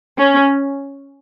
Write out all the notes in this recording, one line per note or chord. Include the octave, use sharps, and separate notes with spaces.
C#4